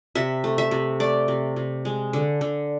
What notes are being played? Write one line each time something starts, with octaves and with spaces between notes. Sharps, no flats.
C3 E5
A3
E5
C3
A3 D5
C3
C3
G#3
D3
D3